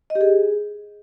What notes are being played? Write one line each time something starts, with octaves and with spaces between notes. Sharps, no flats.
D#5
G4
G#4